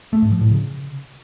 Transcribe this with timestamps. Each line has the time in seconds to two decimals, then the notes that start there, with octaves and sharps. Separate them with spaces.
0.13 A3
0.22 G#2
0.32 F3
0.41 A2
0.51 C#3